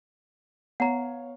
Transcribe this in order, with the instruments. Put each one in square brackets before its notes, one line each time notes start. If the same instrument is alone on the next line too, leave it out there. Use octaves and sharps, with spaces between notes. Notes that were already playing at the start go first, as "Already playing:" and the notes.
[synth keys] B3 C#5 F5 [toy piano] F#5 A#5